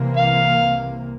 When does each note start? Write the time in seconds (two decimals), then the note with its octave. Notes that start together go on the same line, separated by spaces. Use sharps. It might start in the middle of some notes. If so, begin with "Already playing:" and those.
Already playing: C2 C3 E3 A#3
0.17 F5